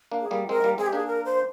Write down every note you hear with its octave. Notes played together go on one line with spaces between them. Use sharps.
A#3 D4
G#4
G3 A#3
G#3 C4 A#4
G3 A#3
G#3 C4 G#4
G4
A#3 D4 G#4
A#4
C5